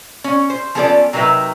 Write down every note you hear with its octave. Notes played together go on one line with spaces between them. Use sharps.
C#4
C5
F3 B3 C#4 A4 A#4 D5
C3 F#3 D#4 A#4 B4 E5